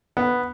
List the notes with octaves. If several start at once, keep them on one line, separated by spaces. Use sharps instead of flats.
B3